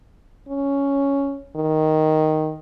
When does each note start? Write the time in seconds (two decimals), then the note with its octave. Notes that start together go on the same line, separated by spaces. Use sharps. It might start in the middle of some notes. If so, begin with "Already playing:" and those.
0.48 C#4
1.56 D#3